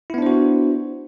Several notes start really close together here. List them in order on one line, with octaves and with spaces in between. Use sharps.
E4 B3 D4 C5 F#4